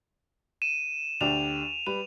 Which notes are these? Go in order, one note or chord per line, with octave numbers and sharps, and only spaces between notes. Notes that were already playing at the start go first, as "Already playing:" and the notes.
D#7 E7
D2 D4 G4 F7
G3 B4 F7